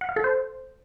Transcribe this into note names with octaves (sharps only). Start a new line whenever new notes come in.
F#5
F5
A4
C5